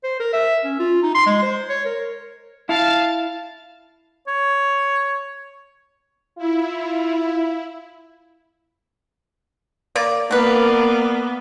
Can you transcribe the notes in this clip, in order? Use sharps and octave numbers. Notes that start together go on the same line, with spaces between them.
C5
A#4
E5
C#4
F4
D#4
C6
G#3
C5
C#5
A#4
E4 F5 A5
C#5
E4 F4
A#3 D5
A#3 B3 F#4 A#4 B4 D5